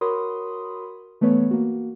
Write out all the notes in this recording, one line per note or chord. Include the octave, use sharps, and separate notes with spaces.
F#4 A#4 C#5 B5 C6 D#6
E3 A3 B3 B4 C#5
A#3 F#4